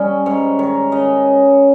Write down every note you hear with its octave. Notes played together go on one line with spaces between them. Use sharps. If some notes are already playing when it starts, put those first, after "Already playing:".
Already playing: G3 C#4 C#5 D#5
G#2 C#5
D#3 C#5
C#3 D#5